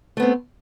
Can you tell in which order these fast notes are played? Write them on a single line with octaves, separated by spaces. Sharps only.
A3 B3 C4